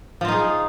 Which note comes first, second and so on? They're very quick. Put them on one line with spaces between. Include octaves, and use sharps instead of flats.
F3 F4 D#4 G#4